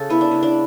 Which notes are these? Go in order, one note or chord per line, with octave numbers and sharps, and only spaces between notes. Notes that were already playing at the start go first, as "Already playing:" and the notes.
Already playing: C#3 A4
B3 E4
D4
C#3
D4